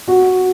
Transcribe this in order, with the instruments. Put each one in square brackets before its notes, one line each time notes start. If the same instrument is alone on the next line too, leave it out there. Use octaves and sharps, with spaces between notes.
[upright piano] F#4